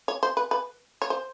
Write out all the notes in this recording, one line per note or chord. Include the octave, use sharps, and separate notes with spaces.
C#5
C5
B4
B4
C#5
C5